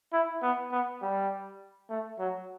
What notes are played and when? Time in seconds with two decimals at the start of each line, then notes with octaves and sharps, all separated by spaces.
0.13 E4
0.42 B3
0.72 B3
1.01 G3
1.89 A3
2.19 F#3